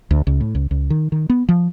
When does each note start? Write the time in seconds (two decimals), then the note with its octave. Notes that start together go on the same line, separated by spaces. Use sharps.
0.11 D2
0.27 C#2
0.41 A2
0.55 C#2
0.71 C#2
0.90 D#3
1.12 D#3
1.30 B3
1.49 F3